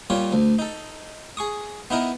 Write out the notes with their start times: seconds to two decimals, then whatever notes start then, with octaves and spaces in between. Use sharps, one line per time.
0.10 A#2 G3 F4 C#5
0.32 D2
0.59 D#4 A4
1.37 G#4 C#6 D#6
1.90 B3 D#4 E4 A#4